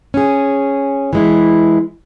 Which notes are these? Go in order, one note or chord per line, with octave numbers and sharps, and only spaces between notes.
C#4 G#4
E3 G#3 E4